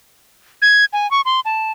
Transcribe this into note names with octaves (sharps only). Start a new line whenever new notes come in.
G#6
G#5
C#6
C6
A5